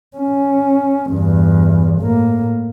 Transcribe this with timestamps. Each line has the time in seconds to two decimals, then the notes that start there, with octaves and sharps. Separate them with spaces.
0.17 C#4
1.11 E2 G2
2.00 A2 A#3